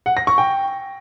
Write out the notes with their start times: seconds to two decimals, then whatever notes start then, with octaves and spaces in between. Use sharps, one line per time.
0.06 F#5
0.17 A#6
0.27 C#6
0.38 G5